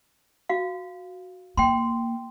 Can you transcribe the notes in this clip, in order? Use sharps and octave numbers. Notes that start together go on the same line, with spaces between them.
F#4 F5
A#3 G5 C6